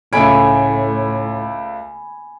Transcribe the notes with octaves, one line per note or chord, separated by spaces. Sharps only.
C#2 A2 A3 G#5 B5 D7